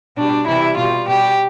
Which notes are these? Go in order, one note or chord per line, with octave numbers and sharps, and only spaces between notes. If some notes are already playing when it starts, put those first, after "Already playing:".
B2 G3 D4
C3 E3 G3 E4
B2 G3 F4
B2 G3 G4